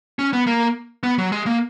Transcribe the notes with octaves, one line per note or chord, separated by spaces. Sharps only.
C#4
B3
A#3
B3
F#3
G#3
A#3